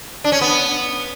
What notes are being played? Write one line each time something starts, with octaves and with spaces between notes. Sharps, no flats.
D4
C#4
B3